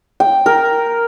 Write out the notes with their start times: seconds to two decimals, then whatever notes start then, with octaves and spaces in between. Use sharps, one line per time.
0.20 G5
0.46 A#4